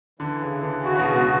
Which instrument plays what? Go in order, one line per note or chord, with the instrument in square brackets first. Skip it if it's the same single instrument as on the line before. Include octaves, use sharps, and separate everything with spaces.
[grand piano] D3 [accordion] E3
[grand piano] C#3
[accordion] E3
[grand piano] D3
[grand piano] C#3 [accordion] F#4
[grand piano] C#3
B2
[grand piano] B2 [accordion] G#3